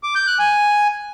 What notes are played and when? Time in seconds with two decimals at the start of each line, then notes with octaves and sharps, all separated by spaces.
0.03 D6
0.15 G6
0.27 F#6
0.39 G#5